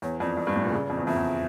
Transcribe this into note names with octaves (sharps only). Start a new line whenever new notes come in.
E2 C#5
F2 D5
F2
G2
A2
A#2
C#3
F2
E2
F2 E5
E2